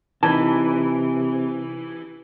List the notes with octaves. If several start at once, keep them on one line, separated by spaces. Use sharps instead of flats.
C3 E3 D#4 B4 A5